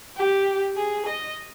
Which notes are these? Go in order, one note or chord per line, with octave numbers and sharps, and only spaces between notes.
G4
G#4
D#5